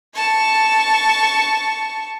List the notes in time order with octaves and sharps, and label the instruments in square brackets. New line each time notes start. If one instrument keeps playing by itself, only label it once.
[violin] A5 C#6